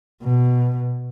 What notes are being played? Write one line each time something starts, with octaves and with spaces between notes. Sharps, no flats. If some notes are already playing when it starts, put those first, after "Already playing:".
B2